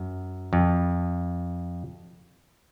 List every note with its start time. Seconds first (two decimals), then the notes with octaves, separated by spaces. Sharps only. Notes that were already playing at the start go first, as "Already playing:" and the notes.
Already playing: F#2
0.53 F2